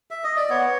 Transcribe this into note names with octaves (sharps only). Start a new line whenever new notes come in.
E5
D#5
D5
B3 C#5